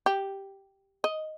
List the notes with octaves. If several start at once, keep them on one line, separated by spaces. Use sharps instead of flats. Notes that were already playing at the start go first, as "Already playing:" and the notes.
G4
D#5